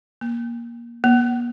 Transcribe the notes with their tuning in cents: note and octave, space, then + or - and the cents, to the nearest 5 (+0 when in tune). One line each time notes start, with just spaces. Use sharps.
A#3 +15
A#3 +45